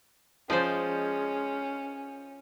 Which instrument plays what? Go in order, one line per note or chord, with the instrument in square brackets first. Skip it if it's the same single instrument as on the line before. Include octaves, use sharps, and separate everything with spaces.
[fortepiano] F3 [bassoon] G#3 [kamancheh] C#4 [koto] C5 D5 D#5